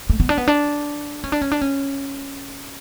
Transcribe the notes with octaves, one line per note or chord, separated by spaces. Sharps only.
A3
B3
D4
B3
D4
C#4
D4
C#4
D4
C#4